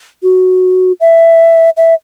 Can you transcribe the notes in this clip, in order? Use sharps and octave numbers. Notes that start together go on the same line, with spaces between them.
F#4
E5
E5